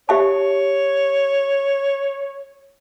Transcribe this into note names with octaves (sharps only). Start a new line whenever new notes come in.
G4 C#5 E5 A5